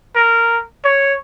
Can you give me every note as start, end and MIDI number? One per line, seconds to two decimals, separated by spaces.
0.15 0.60 70
0.84 1.15 73